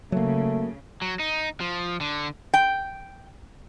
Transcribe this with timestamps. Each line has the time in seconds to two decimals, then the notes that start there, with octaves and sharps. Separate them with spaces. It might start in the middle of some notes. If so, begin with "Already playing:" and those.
0.12 C#3 F#3 A3 A#3
1.02 F#3
1.19 D#4
1.60 F3
2.01 D3
2.54 G5